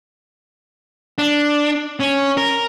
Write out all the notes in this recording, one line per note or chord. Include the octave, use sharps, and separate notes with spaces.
D4
C#4
A#4